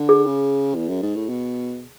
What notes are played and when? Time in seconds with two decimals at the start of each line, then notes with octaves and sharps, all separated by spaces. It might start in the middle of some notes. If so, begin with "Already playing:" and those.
Already playing: D3
0.09 G#4
0.26 C#3
0.75 E2
0.89 F#2
1.02 G#2
1.15 A2
1.29 B2